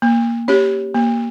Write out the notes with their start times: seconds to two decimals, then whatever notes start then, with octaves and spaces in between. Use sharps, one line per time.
0.02 A#3
0.48 C#4 G4 C#5
0.94 A#3